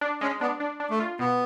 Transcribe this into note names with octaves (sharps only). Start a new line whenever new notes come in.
D4
G#3 C#4
B3 D4
D4
D4
A3
F4
B2 B3